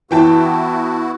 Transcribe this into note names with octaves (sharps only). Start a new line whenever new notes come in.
E3 B3 E4 F#4 G5 A5